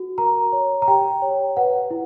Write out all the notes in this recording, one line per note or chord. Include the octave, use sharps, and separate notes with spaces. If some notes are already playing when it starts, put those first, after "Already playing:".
Already playing: F#4
A#4 A#5
C#5
A#5
G4 G5
C#5
B4 F#5
E4